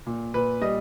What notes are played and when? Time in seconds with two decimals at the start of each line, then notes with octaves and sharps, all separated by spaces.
0.07 A#2
0.34 A#2 B4
0.61 G3 D#5